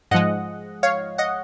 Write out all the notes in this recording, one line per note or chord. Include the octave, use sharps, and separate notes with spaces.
G#2 F3 G#3 D#5 F#5
C#5 F5
D#5 F#5